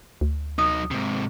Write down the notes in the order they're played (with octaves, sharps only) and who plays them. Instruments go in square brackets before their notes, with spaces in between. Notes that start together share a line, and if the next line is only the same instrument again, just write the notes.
[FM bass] D2
[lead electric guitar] F#3 D#4 [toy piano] D#6
[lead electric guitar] G#2 C3